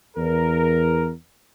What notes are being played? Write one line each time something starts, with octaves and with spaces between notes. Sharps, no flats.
E2 A#4